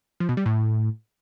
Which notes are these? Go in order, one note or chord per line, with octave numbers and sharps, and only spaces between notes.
F3
B2
G3
A2